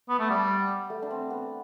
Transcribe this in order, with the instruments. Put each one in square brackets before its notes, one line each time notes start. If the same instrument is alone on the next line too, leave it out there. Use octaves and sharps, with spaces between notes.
[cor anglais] B3
A3
[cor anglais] G3 [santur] B3
[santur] A3
D4
C4
B3